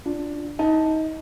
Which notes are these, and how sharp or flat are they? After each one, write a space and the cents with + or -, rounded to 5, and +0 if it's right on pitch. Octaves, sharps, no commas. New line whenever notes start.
D4 +0 F4 +0
D#4 +25 A5 +0